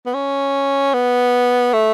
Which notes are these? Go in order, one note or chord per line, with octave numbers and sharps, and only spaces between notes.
B3
C#4
B3
A3